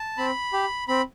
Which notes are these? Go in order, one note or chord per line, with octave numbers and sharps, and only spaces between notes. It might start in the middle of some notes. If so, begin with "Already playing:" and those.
Already playing: A5
C4 B5
G4
C4 B5